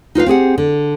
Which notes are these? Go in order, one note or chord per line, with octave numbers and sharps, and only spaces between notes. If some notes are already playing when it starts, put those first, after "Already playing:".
D#4 F4 B4 F5
C4 G4 G#4 F#5
D3